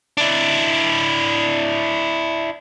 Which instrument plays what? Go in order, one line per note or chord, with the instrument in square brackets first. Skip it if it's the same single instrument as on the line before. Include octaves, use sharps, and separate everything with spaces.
[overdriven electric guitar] D4 E4